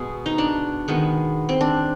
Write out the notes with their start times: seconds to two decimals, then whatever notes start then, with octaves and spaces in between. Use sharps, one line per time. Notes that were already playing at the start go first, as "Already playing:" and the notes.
Already playing: B2 G#3 G#4
0.26 D#4
0.38 D4
0.88 D#3 G#3 B3
1.49 C4
1.61 D4